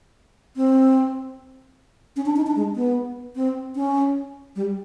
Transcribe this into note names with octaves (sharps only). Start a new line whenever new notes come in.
C4
C#4
D4
D#4
D4
G#3
B3
C4
C#4
G3